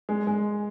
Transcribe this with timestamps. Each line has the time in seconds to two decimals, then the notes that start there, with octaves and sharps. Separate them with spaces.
0.09 G#3
0.27 G#3